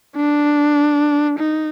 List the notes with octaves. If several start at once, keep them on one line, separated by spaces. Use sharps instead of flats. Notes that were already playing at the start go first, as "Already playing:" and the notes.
D4
D#4